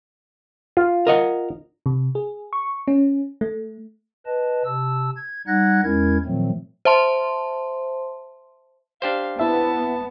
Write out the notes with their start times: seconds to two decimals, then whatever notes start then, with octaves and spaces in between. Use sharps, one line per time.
0.77 F4
1.07 A#4 D#5 F#5
1.86 C3
2.15 G#4
2.53 C#6
2.88 C#4
3.41 A3
4.26 B4 D#5 A5
4.65 C3 A5 E6
5.17 G#6
5.47 G3 D#4 F#5 F#6 G#6 A#6
5.84 E2 G#3 C#4 E4 A#4 G#6
6.26 A#2 D#3 F3 F#3 A3 C4
6.85 C5 E5 A5 C6
9.02 D4 G4 C5 F5
9.39 B3 E4 E5 A5